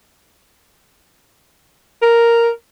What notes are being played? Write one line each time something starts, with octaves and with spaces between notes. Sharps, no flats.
A#4